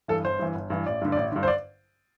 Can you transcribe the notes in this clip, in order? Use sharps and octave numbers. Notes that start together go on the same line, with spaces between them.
G2 E3 A4
G1 C5
G2 E3
G1
G2 E3
A1 D5
G2 D3
A1 D5
G2 D3
C5
D5